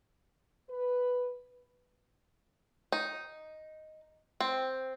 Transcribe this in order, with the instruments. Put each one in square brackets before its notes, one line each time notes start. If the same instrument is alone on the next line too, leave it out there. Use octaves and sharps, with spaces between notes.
[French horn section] B4
[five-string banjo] D#4
C4